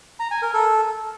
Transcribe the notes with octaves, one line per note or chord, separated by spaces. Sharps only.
A#5
G#5
A#4
A4